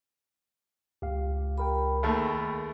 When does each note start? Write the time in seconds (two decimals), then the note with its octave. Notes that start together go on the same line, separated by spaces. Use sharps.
1.02 C#2 G4 F5
1.58 G4 A#4 G5 B5
2.03 D#2 A3 G#4 A#4